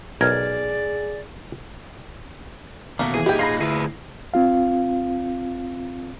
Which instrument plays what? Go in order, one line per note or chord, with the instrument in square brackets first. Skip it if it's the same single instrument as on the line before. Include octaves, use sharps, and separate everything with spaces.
[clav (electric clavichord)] B1 A#4 [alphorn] G#4 [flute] D5 [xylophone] F6 G#6
[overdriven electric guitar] D#2 B2 [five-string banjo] A3 A#3
[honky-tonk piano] E3 [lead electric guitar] G#4
[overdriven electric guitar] A#2 D#4 [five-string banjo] E4 G5 [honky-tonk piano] G4
[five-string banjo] F4 [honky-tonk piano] B5 A#6 C7
[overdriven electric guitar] D2 [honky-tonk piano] E4 [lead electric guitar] G#4 B4
[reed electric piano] C4 F4 F5